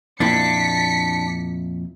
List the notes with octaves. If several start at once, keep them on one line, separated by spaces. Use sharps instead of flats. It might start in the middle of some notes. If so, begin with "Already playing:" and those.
F2 A#2 D4 E4 B6 C#7